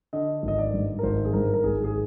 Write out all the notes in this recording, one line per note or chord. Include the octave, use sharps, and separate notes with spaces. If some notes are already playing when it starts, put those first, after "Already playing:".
D3 D#5
G#1 D#5
D5
G2
A#4
G#1 C5
G#4
G2 A#4
A#4
G#1 G#4
G#4